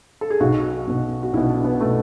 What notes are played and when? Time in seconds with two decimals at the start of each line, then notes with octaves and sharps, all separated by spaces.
0.21 A4
0.30 G#4
0.40 B1 B2 F#4
0.87 B1 B2
1.23 F#4
1.33 B1 B2 E4
1.49 D4
1.65 B3
1.81 B2 A3